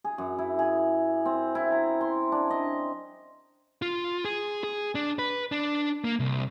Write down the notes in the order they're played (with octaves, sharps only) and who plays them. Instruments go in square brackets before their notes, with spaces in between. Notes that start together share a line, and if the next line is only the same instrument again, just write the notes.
[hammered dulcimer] G#4
F#2
E4
G#4
C4
E4
A#5
C6
D4
D#5
[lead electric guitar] F4
G#4
G#4
D4
B4
D4
A#3
C2